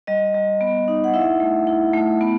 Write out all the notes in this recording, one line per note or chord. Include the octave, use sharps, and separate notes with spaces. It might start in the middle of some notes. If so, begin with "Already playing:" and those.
G3 D#5
G3
B3
D#4
F#5
E4 E5
A3
E4
A3
B3